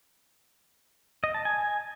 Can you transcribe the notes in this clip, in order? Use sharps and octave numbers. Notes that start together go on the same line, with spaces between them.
D#5
A5
G#5